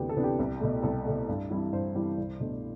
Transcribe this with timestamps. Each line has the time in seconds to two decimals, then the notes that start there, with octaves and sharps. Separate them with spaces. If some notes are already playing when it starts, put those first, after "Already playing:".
Already playing: D2 C3 E3 B3 D4 G4
0.09 A4
0.16 C3 E3 B3 D4
0.24 G4
0.39 C2
0.60 B2 A3
0.83 C2 A4
1.05 B2 A3
1.28 G2
1.50 E3 G3 C4 E4
1.72 G2 C5
1.95 E3 G3 C4 E4
2.18 C2
2.40 B2 A3 D4